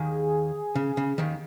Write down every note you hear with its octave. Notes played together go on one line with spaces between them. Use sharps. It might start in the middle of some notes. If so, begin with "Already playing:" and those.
Already playing: D#2 D#3 G#4
C#3
C#3
D#2 D#3